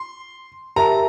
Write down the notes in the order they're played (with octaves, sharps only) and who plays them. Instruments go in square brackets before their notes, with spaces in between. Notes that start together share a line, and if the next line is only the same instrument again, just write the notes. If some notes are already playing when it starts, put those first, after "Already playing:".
Already playing: [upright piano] C6
[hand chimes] G4 A#4 E5 A5 [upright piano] A#5